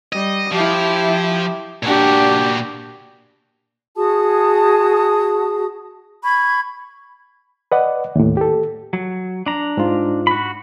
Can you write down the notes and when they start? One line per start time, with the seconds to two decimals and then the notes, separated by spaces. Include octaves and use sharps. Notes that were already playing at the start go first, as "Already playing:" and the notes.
0.13 G3 D#5
0.52 F3 E4 G4
1.83 A#2 D4 F#4 G4
3.96 F#4 G#4 A5 D#6
6.25 B5 C#6 G#6
7.72 B4 D5 D#5 F#5
8.16 D#2 A2
8.37 G4 A4
8.93 F#3
9.46 D4 A#5
9.77 G#2 F4
10.27 F#4 B5